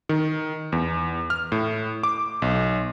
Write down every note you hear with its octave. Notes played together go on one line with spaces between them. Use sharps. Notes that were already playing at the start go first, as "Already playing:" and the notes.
D#3
E2
F6
A2
D6
B1